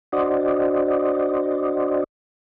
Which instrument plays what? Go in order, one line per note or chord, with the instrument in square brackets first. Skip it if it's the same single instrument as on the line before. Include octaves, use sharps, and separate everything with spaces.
[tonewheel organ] D4 F#4 C5 D5 D#5